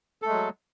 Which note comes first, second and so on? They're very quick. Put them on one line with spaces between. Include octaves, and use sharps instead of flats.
A4 A3 G#3 F#3